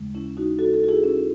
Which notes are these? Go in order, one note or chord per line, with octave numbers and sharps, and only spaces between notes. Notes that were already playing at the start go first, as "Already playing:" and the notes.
Already playing: D#2 C#3 G#3
C#4 E4
D#4 F#4
F#4 A4
F#4 A4
F#4
E4 G#4
C#4 E4